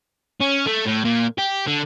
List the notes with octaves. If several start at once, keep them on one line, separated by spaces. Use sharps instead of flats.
C#4
A3
A2
A#2
G4
D3